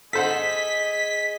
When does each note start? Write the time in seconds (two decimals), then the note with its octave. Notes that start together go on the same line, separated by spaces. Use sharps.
0.13 G#4 A4 C5 D#5 F#5 B6